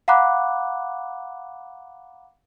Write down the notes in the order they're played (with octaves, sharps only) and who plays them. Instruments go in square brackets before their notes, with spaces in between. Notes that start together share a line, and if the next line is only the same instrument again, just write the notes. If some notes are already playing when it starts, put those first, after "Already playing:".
[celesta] F5 F#5 A#5 B5 D6 F#6